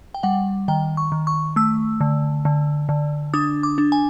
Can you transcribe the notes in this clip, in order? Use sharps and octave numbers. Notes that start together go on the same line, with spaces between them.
G5
G3 F#5
D#3 G5
C#6
D#3
C#6
A3 E6
D3
D3
D3
D4 D#6
D6
D4
G#5